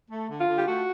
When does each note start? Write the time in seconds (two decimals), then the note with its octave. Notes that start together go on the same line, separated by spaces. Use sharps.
0.10 A3
0.28 D3
0.38 F4
0.47 D3
0.56 G4
0.65 A3 F#4